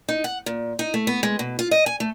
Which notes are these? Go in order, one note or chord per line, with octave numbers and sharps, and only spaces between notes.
D#4
F#5
A#2
D#4
A3
B3
G#3
B2
F4
D#5
G#5
A3